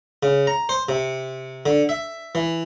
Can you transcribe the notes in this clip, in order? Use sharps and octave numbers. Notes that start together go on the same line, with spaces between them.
C#3
A#5
C5
C3
D3
E5
E3